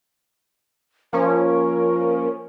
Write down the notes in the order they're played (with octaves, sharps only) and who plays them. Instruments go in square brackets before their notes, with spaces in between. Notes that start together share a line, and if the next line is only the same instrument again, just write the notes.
[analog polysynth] F3 A#3 C#4 [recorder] A#4